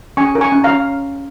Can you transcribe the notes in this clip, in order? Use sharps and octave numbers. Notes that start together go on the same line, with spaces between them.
C#4 G#5 C#6
A#4
G#5 C#6
C#4
F5 A#5
C#4